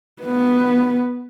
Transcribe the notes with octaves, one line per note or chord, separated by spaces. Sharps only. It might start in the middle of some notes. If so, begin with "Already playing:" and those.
B3 B4